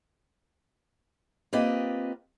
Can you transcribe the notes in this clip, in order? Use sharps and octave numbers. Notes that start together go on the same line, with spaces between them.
A#3 C4 F4 G4 B4 D#5